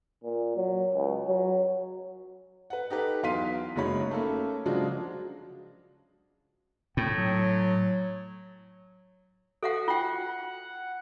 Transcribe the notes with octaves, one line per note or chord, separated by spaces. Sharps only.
A#2
F#3
C#2
F#3
B4 F#5
D#4 G4 A4 B4
E2 F#3 F5 C6 B6 D#7
F#1 F#2 G#3 D#4 C#5 B5
A3 A#3 C#4
C#3 F3 F#3 G#3 D4 F#4
A2 G5
F#3
F#4 A4 F5 F#5
F4 F#5 G5